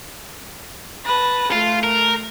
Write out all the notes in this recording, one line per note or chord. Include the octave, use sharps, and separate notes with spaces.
B4 A5 A#6
A3 F4
A#4